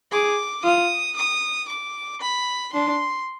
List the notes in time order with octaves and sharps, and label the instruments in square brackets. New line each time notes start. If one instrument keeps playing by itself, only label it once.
[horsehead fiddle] G#4 [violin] D6
[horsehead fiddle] F4 [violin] D#6
[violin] D#6
D6
B5
[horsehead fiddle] D4 [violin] C6